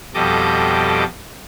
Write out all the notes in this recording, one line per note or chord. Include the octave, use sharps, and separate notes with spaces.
F2 B2 G3 A4 D#5 D6